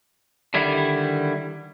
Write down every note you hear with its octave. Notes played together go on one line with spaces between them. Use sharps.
D3 D#3 G3 E4